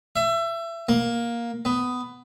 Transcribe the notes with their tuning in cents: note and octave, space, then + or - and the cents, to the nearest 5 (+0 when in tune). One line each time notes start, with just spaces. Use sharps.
E5 +25
A#3 +10
B3 +15